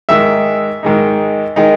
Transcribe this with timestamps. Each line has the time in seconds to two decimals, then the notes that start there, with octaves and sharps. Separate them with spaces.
0.09 G#2 D#3 G#3 D#4 E5
0.83 G#2 D#3 G#3 D#4
1.56 D#3 G#3 D#4